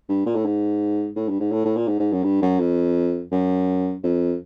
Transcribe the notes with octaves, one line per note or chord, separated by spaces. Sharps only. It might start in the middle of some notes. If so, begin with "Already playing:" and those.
G2
A#2
A2
G#2
A2
G2
G#2
A2
A2
A#2
G#2
G#2
F#2
G2
F#2
F2
F#2
F2